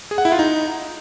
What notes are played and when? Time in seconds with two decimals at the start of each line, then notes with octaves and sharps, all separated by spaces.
0.11 G#4
0.18 F#5
0.25 E4
0.32 F4
0.39 D#4